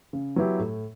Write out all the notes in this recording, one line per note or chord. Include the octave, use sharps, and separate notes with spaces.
C#3
F#3 B3 E4 G4
A2